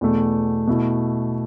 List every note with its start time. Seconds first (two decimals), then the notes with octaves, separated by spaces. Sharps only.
0.01 E2 B2 A3
0.67 B2 A3 E4